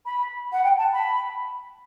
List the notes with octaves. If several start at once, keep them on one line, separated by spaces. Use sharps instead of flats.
B5
F#5
G5
A5
B5